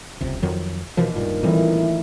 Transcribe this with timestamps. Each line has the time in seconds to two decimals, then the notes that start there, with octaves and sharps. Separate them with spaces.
0.21 D#1 C#2 C3
0.42 F2 D#3 F#3
0.97 D#2 B2 E3 F3
1.15 D1 G2 A#2 F4
1.43 A1 A#2 D#3 E3 G3 C4